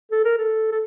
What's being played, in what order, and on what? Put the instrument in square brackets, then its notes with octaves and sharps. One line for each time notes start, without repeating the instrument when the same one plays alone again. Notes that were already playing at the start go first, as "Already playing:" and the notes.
[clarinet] A4
A#4
A4
A4